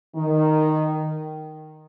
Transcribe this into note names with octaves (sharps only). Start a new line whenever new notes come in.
D#3